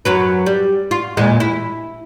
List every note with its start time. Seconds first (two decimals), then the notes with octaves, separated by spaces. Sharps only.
0.05 F#2 F#3 B4
0.46 G3
0.91 F4
1.17 E2 A#2 G#3
1.40 E4